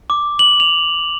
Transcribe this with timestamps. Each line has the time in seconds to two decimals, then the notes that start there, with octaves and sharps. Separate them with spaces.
0.10 D6
0.39 F#7
0.60 F7